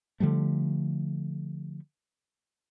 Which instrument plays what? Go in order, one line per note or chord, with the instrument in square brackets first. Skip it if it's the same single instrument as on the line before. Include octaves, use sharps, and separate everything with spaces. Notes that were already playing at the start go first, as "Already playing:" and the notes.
[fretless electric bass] D3 F3 G3 A3